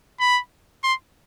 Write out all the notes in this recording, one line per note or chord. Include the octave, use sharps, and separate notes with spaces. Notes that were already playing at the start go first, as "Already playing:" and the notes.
B5
C6